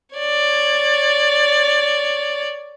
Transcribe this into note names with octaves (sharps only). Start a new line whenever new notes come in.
C#5 D5